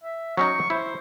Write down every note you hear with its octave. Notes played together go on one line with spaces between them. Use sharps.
E5
F#3 C#4 D#4 C#6
E4 C5